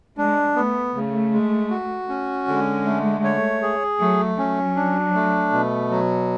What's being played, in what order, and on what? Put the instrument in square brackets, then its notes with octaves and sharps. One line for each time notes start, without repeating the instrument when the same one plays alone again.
[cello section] G#3 [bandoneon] D4
[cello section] A3 [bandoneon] B3
[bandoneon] C#3 [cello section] A3
[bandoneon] G#3
F#4
C#4
[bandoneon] D3 [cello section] G#3
[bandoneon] A3
C#5
G#4
[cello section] F#3 [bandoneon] A3
[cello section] F#3 [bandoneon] C#4
[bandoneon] D4
A3
B2
F#3